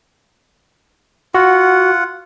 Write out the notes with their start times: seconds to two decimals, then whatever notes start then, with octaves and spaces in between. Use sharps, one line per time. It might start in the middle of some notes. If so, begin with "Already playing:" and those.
1.35 F4 F#4 F#5